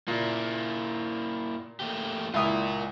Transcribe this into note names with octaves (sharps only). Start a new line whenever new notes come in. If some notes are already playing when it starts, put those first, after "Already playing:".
A#2 A#3 E4
A3 A#3 G4
C#2 E4 F4 A#4 D#6